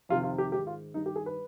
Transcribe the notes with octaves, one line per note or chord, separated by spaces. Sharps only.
F2 C3 D#3 F4
F4
G4
G#2 D#3 G4
F4
G2 D#3 D#4
G4
G#4
B4